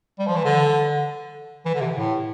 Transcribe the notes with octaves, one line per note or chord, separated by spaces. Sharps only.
G3
F3
E3
D3
E3
D3
C3
A2